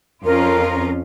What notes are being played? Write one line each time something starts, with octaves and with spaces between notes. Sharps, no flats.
F2 C#4 F4 A#4